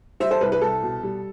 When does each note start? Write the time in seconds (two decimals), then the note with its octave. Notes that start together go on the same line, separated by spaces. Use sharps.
0.20 G3 C5 E5
0.31 A4 C5
0.41 C2 B4
0.52 B4
0.61 C2 A4
0.82 B2
1.03 G3